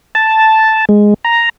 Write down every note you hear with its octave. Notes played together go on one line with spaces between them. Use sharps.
A5
G#3
A#5